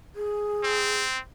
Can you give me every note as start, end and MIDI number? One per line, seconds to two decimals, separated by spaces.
0.16 1.01 68
0.63 1.19 60